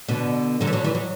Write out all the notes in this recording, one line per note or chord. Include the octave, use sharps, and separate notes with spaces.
B2 D3
D3 F#3
E3
D3 F#3
E3
F#3